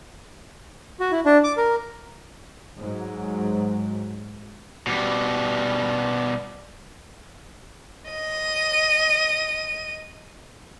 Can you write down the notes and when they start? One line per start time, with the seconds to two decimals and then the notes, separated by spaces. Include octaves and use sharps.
1.00 F#4
1.12 E4
1.26 D4
1.44 D6
1.57 A#4
2.78 G#2 F#3
4.87 B2 G3
8.10 D#5 D#7